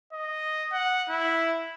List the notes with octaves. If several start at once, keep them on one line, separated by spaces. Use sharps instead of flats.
D#5
F#5
E4